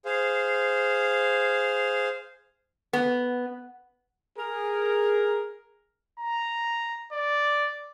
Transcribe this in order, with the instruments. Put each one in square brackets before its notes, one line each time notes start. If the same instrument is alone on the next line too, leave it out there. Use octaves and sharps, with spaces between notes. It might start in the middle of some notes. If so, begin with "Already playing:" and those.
[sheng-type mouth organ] G#4 C5 F5
[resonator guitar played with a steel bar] B3
[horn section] G#4 A#4
[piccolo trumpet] A#5
D5